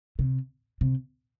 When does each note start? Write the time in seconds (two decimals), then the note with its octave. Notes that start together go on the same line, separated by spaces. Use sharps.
0.19 C3
0.81 C3